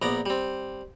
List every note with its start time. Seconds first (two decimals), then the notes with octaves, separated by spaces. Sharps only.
0.02 A#1 B3 D5 A#5
0.26 G3 C4